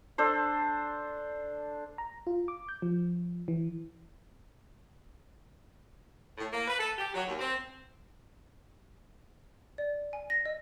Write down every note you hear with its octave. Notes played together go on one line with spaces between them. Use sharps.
D4 A4 C5
A#5
F4
D6
G6
F3
E3
A2
A#3
B4
A4
G4
F#3
D#2
C4
D5
G#5
A#6
D#5